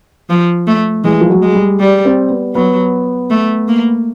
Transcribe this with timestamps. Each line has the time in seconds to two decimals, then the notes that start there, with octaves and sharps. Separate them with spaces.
0.30 F3
0.67 A3
1.04 E3 G#3
1.21 F3
1.30 F#3
1.42 G#3
1.55 G3
1.80 G3
2.05 C4
2.30 B3
2.55 F#3 B3
3.30 A3
3.68 A#3